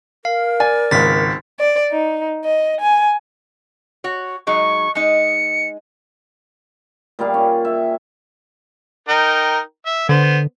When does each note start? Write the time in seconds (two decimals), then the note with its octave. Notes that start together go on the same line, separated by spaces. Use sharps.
0.25 A#4 F5
0.60 D5 G#5
0.91 G#1 C#2 A6 B6
1.60 D5
1.92 D#4
2.44 D#5
2.81 G#5
4.04 F#4 C#5
4.47 F#3 G#3 D#4 C#6
4.95 G#3 D#4 C#7
7.19 A#2 G3 G#4 F5
7.34 C#4
7.65 E5
9.08 D#4 A#4 G5
9.86 E5
10.09 D3 B3 C5